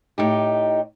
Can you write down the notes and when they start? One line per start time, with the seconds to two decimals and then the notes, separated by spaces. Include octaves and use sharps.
0.18 A2 D#4 G4